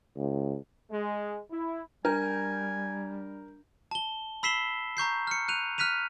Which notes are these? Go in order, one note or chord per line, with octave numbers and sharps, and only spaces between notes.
C#2
G#3
E4
G3 D4 A#4 G#5 A#5 G6
A5 G7
B5 E6 B6 C7 E7 G7
A#5 C#6 G6 C7
F6 C#7
F#6 D#7 F7
F6 F#6 B6 D#7 F7